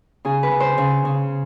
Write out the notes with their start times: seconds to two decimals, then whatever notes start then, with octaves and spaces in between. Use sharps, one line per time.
0.25 C#3 G#4
0.43 B4
0.51 C#3
0.60 C5
0.78 C#3
1.05 C#3